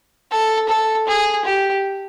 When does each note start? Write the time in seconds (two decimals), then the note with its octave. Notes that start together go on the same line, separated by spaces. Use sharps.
0.31 A4
0.69 A4
1.07 G#4
1.45 G4